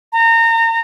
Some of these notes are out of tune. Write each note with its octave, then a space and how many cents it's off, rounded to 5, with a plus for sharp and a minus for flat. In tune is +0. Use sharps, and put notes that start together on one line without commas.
A#5 -30